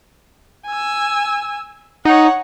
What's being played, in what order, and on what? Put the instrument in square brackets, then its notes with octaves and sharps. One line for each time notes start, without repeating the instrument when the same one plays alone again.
[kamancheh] G#5 E6
[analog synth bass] D#4 [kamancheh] C#5 F#5